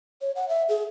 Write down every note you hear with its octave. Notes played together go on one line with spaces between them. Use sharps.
C#5
F#5
E5
G#4